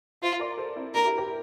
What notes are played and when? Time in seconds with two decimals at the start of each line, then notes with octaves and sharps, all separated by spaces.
0.22 F4 C5 E5
0.40 A#4 D5
0.57 A4 C5
0.76 C4 E4
0.94 A#3 D4 A#4
1.05 E4 G4
1.18 G4 A#4